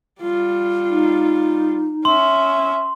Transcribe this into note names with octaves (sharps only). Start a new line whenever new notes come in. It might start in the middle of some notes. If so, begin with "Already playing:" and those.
G3 F4
D#4
C#4 E5 C6